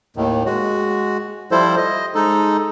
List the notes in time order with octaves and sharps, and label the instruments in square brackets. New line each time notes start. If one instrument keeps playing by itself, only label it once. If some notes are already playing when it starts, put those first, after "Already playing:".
[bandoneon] D#2 A2 D#3
G#3 F#4
F3 G3 E4 A4 C5
D#5
G#3 D#4 A4